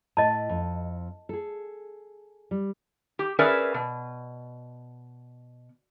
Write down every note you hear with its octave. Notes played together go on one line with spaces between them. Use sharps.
A2 D#5 A5
F2
G#4 A4
G3
G4
C#4 G#4 A#4 B4 D5 E5
B2